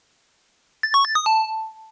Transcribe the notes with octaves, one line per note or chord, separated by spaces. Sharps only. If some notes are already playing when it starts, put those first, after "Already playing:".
A6
C#6
A6
D#6
A5